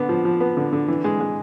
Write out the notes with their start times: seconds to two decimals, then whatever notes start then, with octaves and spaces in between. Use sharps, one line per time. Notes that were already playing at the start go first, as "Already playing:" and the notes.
Already playing: D3 B3
0.09 F3
0.25 F3
0.40 B3
0.57 D3
0.73 D3
0.88 E3
1.04 G#3
1.20 G#3